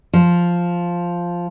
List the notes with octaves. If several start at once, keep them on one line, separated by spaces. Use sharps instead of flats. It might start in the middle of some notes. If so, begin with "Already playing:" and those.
F3